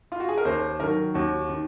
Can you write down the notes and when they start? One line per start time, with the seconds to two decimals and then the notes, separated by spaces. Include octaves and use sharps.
0.12 F4
0.20 F#4
0.29 G#4
0.37 A#4
0.45 D#2 C5
0.80 D#3 F#3 A#4
1.14 D#2 F#4
1.49 D#3